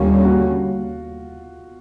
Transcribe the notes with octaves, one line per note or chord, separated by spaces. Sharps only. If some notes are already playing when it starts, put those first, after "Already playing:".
Already playing: D#2 D3 G3 A#3 C#4 F4
F#4